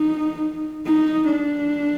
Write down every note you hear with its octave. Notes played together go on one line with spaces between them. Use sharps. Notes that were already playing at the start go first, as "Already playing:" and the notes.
Already playing: D#4
D#4
D4